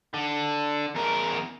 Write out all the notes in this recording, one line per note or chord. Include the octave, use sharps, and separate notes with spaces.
D3
E2 A#4